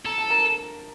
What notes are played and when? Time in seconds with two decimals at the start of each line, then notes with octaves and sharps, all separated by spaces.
0.06 A4 A#5
0.18 A5
0.30 A#4 A#5